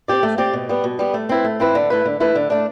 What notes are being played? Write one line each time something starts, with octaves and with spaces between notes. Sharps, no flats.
C4 G4 D5
A3
C4 G4 D5
B2
G3 B3
B2
G3 B3
A3
C4 E4 B4
A3
C4 E4 B4
D3
A3 E4 B4
D3
A3 E4 B4
D3
A3 D4